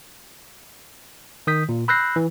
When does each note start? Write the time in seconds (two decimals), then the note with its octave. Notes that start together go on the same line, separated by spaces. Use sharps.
1.47 D#3 D#6 G6 B6
1.69 A#2
1.88 B5 E6 F#6 G6 A#6 C7
2.16 E3